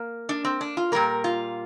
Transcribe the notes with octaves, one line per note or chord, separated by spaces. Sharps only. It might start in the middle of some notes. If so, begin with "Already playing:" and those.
Already playing: A#3
D4
C4
D4
F4
A#2 G3 A#3 A#4
F4